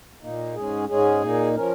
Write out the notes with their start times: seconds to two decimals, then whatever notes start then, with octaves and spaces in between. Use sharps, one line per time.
0.22 A#2 A#3 D#4
0.55 G#2 G#3 C#4 G#4
0.89 G#2 G#3 C#4 G#4
1.22 A#2 A#3 D#4
1.56 F3 C#4 A#4